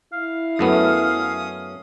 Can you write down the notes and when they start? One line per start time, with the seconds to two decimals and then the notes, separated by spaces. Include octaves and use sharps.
0.13 E4 F5
0.59 F#2 A3 B3 C#4 D#6